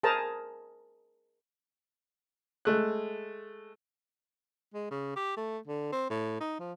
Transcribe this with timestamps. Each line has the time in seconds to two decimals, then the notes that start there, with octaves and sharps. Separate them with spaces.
0.03 G#4 A#4 C5 A5 A#5
2.65 G#3 A3 F#6
4.74 G#3
4.91 C#3
5.16 G4
5.37 A3
5.67 D3
5.92 C4
6.10 A2
6.41 D#4
6.60 F3